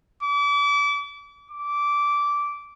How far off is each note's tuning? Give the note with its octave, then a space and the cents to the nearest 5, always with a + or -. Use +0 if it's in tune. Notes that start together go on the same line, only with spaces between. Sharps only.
D6 -35
D6 -15